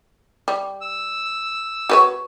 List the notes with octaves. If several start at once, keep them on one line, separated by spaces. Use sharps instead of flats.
G3
E6
F#4 B4 C#5